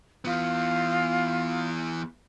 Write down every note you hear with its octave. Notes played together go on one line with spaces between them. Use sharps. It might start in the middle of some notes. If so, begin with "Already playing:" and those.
E3 B3 F4